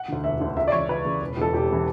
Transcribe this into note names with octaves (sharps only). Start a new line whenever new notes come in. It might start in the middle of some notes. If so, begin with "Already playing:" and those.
Already playing: F#5
D2 D3
E1 E5
D2 D3
C#2 E5
D5
C#3 E3 C#5
C#2 B4
C#3 E3
E1
E2 C#3 E3 A4
E1 G4
C#3 E3